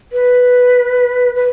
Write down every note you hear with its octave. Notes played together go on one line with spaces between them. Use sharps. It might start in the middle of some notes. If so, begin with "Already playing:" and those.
B4
B4